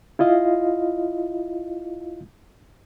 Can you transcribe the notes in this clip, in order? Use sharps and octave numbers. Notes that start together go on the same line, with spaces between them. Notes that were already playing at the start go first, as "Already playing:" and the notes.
E4 F4 D#5 F5